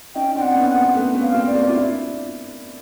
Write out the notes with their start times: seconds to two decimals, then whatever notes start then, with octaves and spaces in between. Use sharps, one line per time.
0.15 C#4 D#4 G5
0.35 C4 D4 G5
0.42 F#5
0.56 B3 C#4
0.68 F#5
0.75 A#3 C4
0.95 A3 B3
1.15 B3 C#4
1.22 F5
1.34 A#3 C4
1.47 D5
1.54 A#3 C4
1.69 F4
1.74 D4 E4